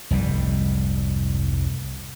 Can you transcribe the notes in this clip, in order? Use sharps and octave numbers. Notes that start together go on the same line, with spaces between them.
F1 C2 G#2 G3